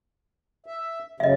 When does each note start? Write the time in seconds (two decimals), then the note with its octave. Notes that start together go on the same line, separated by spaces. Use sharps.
0.66 E5
1.20 F#2 C#3 D#5 E5